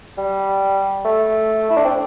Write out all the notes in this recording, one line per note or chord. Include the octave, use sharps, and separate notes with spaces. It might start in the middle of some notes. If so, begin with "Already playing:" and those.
G3
A3
E4
D4
C4